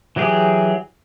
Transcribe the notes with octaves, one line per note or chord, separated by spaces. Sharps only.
E3 F#3 G4 G#4